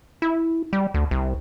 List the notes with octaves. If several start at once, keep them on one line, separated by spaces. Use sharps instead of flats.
E4
G3
D2
C2